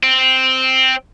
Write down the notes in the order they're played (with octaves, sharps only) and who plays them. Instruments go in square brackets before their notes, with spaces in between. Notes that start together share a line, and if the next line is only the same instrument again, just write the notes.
[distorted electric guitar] C4